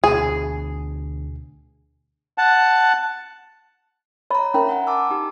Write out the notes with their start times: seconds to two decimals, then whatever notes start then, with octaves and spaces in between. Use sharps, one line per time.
0.04 D2 B2 G#4
2.38 F#5 A5
4.31 C#5 D#5 A#5 B5
4.54 C#4 A#4 E5 A#5 B5
4.68 F#5 G#5
4.87 A5 D6 E6
5.10 D#4 G4